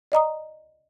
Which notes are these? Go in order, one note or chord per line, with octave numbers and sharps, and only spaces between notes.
D5 D#5 A#5 D#6